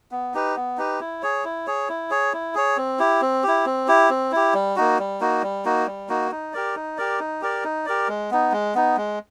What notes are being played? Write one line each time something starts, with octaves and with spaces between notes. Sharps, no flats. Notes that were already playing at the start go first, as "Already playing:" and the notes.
B3
D#4 G4 B4
B3
D#4 G4 B4
E4
G#4 C#5
E4
G#4 C#5
E4
G#4 C#5
E4
G#4 C#5
C4
E4 G4
C4
E4 G4
C4
E4 G4
C4
E4 G4
G3
A#3 D#4 F#4
G3
A#3 D#4 F#4
G3
A#3 D#4 F#4
G3
A#3 D#4 F#4
D#4
G4 A#4 D5
D#4
G4 A#4 D5
D#4
G4 A#4 D5
D#4
G4 A#4 D5
G#3
B3 D#4
G#3
B3 D#4
G#3